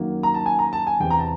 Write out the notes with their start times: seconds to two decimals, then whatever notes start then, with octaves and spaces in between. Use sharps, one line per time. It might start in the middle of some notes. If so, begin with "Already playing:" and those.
Already playing: F#2 D#3 F#3 A#3
0.23 A#5
0.34 A5
0.46 G#5
0.59 A#5
0.73 A5
0.87 G#5
1.00 E2 C3 E3 G5
1.10 A#5
1.19 A5